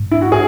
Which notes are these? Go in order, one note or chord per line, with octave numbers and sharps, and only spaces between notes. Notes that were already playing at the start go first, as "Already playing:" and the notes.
Already playing: G#2
E4
F#4
G#4